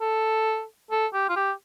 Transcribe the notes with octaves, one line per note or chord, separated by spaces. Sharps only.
A4
A4
G4
F4
G4